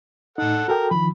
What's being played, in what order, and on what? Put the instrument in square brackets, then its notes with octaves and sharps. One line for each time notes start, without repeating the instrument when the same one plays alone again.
[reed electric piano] A2 D#4 [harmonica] A4 F#5
[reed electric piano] F#4 A4 G5 [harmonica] A#4
[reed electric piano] D#3 F3 [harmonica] B5